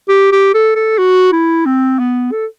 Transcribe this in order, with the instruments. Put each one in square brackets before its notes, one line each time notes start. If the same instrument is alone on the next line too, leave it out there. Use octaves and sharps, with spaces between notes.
[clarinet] G4
G4
A4
A4
F#4
E4
C4
B3
A4